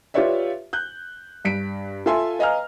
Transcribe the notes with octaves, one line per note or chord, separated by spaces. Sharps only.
F4 G4 B4 C#5 D5 E5
F#6 G6
G2 B6 D7
F4 A4 E5 G#5 C6
B4 D#5 F5 G#5 A#5 F6